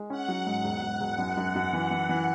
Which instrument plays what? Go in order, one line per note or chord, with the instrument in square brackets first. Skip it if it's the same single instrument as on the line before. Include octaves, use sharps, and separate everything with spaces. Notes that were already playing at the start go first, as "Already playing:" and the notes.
Already playing: [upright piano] G#3
[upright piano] C#4 [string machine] F#5
[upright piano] F#3
G#2
E1
E1
E1
F#2
F#2
F#2
E3
E3
E3